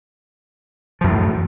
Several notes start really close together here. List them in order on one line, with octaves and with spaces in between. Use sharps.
F3 F#2 E3 A2